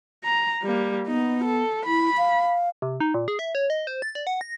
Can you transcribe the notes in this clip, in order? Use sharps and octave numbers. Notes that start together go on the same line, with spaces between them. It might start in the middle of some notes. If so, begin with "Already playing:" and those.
A#5
G3 A#3
B3 D#4
A4
E4 B5
F5
C3
D#4
A#2
G#4
E5
C#5
D#5
C5
A6
D5
F#5
A#6